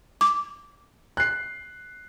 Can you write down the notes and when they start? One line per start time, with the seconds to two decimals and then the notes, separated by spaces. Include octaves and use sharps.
0.21 D6
1.17 F#6 C7